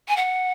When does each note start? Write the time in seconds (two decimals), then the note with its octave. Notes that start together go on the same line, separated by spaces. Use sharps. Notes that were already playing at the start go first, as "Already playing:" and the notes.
0.08 G#5
0.16 F#5